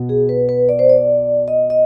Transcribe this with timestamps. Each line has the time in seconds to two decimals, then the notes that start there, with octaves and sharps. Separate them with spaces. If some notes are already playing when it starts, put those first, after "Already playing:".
Already playing: B2 B3
0.09 G#4
0.29 B4
0.49 B4
0.69 D5
0.79 C5
0.89 D5
1.48 D#5
1.70 D#5